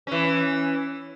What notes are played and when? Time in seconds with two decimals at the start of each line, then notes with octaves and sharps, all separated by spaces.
0.07 E3 C#4